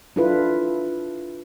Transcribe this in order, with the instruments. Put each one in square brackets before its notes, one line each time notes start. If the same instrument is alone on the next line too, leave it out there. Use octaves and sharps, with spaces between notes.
[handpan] D4 E4 F4 A4 B4